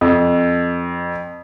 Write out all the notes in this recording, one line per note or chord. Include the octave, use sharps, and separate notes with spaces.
F2